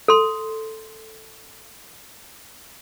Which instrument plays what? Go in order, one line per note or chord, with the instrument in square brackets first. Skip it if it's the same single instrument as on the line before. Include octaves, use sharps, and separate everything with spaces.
[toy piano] A4 C6